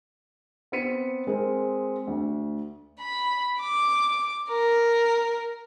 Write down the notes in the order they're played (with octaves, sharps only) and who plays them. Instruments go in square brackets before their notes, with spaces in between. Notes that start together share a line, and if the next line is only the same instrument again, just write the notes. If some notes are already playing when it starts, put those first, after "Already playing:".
[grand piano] B3 C4 B4 B6 C#7 D#7
G#3 C4 G#4 A#4
D2
[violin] B5
D6
A#4